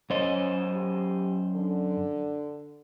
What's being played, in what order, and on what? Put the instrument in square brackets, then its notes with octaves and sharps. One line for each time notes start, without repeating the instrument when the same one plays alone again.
[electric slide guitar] F#2 C5 D#5 [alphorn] C#4
[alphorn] G4
D3